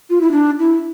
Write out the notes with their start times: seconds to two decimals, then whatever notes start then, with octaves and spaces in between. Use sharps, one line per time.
0.10 F4
0.21 E4
0.32 D4
0.59 E4